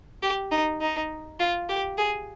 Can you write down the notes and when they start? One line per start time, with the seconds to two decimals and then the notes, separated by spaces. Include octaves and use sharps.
0.22 G4
0.51 D#4
0.81 D#4
1.39 F4
1.69 G4
1.98 G#4